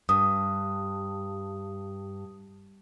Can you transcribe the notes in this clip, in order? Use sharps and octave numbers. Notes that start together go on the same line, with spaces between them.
G2 D#6